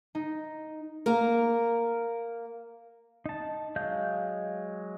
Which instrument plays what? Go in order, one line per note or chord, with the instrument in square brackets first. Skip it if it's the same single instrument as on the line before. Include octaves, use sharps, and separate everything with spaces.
[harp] D#4
[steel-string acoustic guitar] A#3 A#4
[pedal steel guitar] D#4 A5
F#3 G#3 D#5 F5 G6